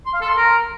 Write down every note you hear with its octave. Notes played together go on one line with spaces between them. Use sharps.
C6
F5
A4
C6
A#4